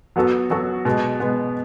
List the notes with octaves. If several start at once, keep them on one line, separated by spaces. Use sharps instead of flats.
F#3 B3 F#4 A4
F#3 B3 F#4 A4
B2 G#3 B3
B2 G#3 B3